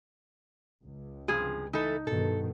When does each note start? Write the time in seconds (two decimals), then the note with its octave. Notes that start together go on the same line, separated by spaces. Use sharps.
0.83 C#2
1.28 G2 C3 F3 G#4
1.73 E3 A3 D#4 A4
2.07 G2 B2 D#3 A4